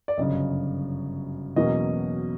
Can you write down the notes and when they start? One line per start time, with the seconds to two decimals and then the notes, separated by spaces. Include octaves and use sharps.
0.08 D5
0.17 G1 F#2 C#3 D#5
1.56 E2 B2 F#3 A#3 C#4 D#5